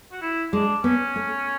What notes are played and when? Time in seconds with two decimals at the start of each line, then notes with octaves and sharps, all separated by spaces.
0.12 F#4
0.21 E4
0.53 G#3 D4
0.84 B3 C#4
1.16 A3